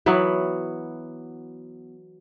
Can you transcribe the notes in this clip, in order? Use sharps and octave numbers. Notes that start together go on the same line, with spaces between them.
E3 F#3 B3